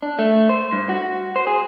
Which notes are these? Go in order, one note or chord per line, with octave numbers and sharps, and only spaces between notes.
D4
A3
C5
G2
F#4
C5
G#4